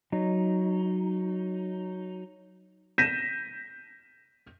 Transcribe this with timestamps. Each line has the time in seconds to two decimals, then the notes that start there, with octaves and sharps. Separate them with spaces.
0.12 F#3 D#4
2.98 G6 A#6 B6 D#7 E7